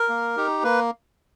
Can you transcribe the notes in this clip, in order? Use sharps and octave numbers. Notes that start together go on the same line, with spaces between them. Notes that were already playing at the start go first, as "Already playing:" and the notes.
Already playing: A#4
A#3
D#4 G4
A#3 B4